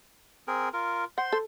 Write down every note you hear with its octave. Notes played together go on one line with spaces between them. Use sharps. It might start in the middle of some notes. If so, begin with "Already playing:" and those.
C4 G#4 A#4
F4 A#4
C5 F#5 C6
A4